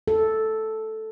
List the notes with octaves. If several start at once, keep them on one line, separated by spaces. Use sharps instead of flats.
A4